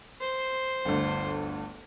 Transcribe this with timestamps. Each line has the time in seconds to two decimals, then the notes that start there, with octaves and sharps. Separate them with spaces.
0.21 C5
0.85 G1 D2